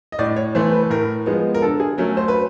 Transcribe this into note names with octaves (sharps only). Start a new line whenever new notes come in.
D#5
A2 D5
C#5
E3 A3 C5
B4
A2 A#4
F3 G#3 B3
A#4
D3 A4
G#4
F#3 A3 C#4 A#4
C5
B4